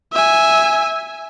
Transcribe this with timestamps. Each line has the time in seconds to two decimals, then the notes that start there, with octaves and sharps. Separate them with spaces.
0.13 E5 G#5